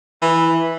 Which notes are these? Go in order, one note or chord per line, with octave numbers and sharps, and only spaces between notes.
E3